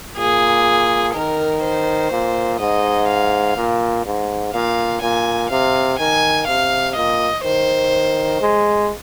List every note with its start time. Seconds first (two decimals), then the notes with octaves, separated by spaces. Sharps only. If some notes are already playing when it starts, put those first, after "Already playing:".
0.18 A#2 G#4
1.14 D#3 A#4
1.64 C5
2.11 A#2
2.60 G#2 D#5
3.08 F5
3.57 A#2
4.06 G#2
4.54 A#2 F5
5.02 A#2 G#5
5.50 C3 F5
5.99 D#3 G#5
6.48 C3 F5
6.96 A#2 D#5
7.44 D#3 C5
8.41 G#3